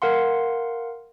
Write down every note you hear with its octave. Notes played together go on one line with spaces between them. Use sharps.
A#4 F5 F#5 C6